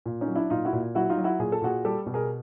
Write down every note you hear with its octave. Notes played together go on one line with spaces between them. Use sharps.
A#2
C#4 D#4
F#3
D4 E4
A#2 D#4 F4
E4 F#4
A#2
F#3 E4 F#4
D#4 F4
F#3
E4 F#4
A#2 G#4
A4
A#2 F#4 G#4
G3 G4 A4
B2
G#4 A#4